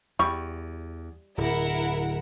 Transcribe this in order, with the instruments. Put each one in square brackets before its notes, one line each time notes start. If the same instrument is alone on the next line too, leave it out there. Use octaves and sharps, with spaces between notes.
[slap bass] E2 [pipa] G3 C#6
[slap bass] D1 [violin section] E4 A#4 F#5